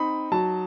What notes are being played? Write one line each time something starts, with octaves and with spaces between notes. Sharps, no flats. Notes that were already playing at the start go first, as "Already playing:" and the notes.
Already playing: C4 D#4 B5
F#3 A5